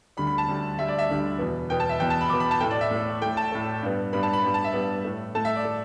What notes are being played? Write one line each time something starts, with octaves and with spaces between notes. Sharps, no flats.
D2 D3 G3 B5
B5
A5
D2 D3 G3
D2 D3 G3 E5
D5
E5
D2 D3 G3
E2 B2 B3
E2 B2 B3 G5
A5
E5
E2 B2 B3 G5
A5
B5
E2 B2 B3 D6
B5
A5
A2 A3 G5
D5
E5
A2 A3
A2 A3 G5
A5
A2 A3
G2 G3 B3
G2 G3 B3 B5
A5
B5
G2 G3 B3
A5
E5
G2 G3 B3
A2 A3
A2 A3 A5
E5
D5
A3